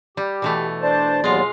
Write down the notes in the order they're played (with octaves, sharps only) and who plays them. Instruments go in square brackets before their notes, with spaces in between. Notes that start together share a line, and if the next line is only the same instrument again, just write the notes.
[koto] G3 [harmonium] G4
[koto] B2 E3 A3
[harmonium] D4 C5 A5 [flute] D5
[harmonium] D#2 F#3 B3 [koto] G#3 F4